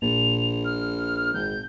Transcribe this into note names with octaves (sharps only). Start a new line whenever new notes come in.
A#1 A#2 F7
F6
G#1 G6